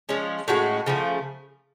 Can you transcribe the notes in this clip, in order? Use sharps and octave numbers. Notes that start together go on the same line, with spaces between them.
F3 G#3 C#4
A2 G#3 C#4 F#4
C#3 F3 A3